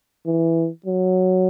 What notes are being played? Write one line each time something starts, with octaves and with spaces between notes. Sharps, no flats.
E3
F#3